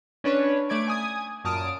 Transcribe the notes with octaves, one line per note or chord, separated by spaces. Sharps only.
C#4 D4 B4 C#5
A3 D5 G#6 D7
G#5 D#6 G#6
F#2 A#2 A5 D#6 F6 D7